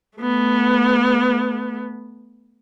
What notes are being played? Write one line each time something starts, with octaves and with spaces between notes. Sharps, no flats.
A3 B3